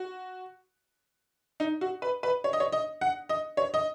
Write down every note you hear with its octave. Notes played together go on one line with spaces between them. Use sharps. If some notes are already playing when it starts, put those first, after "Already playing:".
Already playing: F#4
D#4
F#4
B4
B4
C#5
D#5
C#5
D#5
F#5
D#5
C#5
D#5